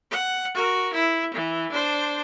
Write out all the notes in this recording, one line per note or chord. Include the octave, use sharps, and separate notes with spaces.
F#5
F#4 A#4
E4
E3
D4 C5